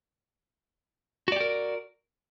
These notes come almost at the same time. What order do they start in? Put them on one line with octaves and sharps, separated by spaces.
F#4 D5 G4 A#4